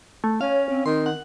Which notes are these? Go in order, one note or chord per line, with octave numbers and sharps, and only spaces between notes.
A3
C#4 C#5 F5
C4
D#3 C6
F#5